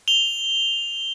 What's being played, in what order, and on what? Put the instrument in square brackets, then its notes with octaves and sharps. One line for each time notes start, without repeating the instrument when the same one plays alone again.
[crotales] F7 G7